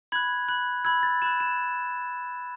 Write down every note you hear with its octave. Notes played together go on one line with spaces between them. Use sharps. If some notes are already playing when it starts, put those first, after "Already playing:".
B5 F#6 G#6
B5 F#6
B5 E6 G#6
A6
B5 F#6 E7
E7